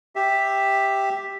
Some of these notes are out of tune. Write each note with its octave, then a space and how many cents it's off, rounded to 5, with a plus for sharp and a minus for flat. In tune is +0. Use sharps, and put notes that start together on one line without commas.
G4 +0 E5 -5